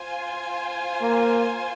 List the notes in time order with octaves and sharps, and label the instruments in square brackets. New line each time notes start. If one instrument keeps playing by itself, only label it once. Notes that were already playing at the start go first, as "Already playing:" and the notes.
Already playing: [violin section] F4 C5 G#5
[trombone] A#3